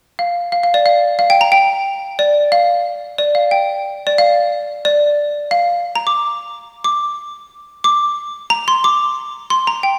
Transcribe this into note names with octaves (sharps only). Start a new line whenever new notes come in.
F5
F5
F5
D5
F5
F5
G5
A#5
G5
D5
F5
D5
F5
G5
D5
F5
D5
F5
A#5
D6
D6
D6
A#5
C6
D6
C6
A#5
G5